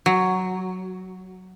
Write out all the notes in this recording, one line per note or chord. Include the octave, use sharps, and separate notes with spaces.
F#3